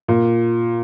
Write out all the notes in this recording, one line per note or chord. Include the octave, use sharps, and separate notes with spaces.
A#2